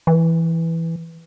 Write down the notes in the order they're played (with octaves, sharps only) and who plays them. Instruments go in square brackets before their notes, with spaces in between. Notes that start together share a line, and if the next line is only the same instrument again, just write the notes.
[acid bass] E3